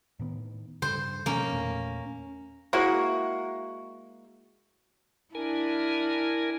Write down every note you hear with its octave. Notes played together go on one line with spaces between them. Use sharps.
A2 D#3 B3
G2 C#3 C5
B2 D#3 F3 A#3 C#4
E2 A#2 A3
G#3 A#3 E4 F#4
D4 E4 A#4 G#5